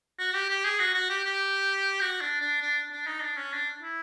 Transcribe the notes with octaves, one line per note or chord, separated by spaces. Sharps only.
F#4
G4
G4
G#4
F#4
F#4
G4
G4
F#4
D4
D4
D4
D4
D#4
D4
C#4
D4
E4